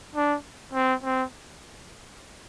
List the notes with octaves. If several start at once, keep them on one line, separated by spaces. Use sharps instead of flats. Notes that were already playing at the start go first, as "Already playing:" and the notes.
D4
C4
C4